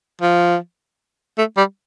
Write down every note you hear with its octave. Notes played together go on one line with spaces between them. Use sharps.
F3
A3
G3